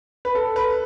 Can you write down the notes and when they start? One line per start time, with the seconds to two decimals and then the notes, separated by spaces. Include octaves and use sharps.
0.25 B4
0.35 A4
0.56 B4